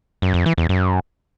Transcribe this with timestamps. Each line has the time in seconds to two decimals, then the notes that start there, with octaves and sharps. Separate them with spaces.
0.22 F#2
0.34 F2
0.46 E3
0.58 E2
0.69 F#2